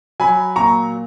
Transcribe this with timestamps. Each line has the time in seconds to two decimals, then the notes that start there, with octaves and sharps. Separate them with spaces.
0.20 F#3 G#5 B5
0.56 A#2 A#5 C#6